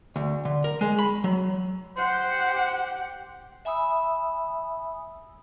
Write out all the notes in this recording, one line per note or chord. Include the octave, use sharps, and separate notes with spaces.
D2
D3
A#4
G#3
B5
F#3
G4 C5 F#5
E5 G#5 B5 D#6 E6